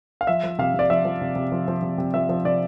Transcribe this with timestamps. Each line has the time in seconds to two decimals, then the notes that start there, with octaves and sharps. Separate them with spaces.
0.21 F5
0.27 F3 E5
0.43 F3
0.59 C3 F5
0.74 C3 D5
0.90 F3 E5
1.05 F3
1.21 C3
1.36 C3
1.52 F3
1.68 F3
1.82 C3
1.98 C3
2.14 F3 E5
2.29 F3
2.45 C3 D5